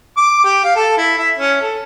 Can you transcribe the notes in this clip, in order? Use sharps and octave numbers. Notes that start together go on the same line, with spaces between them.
D6
G4
F5
A4
E4
E5
C#4
A4